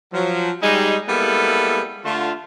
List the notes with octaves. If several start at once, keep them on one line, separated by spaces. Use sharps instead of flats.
F3 F#3
G3 G#3 D#4
G3 G#3 A#3 B3 E4 A4
D3 A3 F4